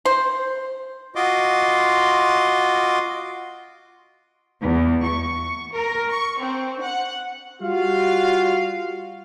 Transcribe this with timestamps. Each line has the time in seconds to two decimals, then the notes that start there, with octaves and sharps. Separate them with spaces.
0.05 C5
1.15 F4 F#4 D#5 C6 D6
4.61 E2
5.03 C#6
5.74 A#4
6.11 C#6
6.41 C4
6.82 F#5
7.61 G3 F4 F#4 F5